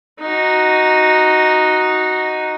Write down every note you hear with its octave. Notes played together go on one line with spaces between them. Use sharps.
D#4 F#4